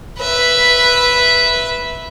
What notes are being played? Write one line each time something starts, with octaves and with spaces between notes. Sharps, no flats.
B4 E5